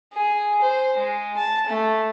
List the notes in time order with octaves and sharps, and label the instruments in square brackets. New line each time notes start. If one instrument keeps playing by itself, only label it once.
[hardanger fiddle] G#4
C5
G#3
A5
A3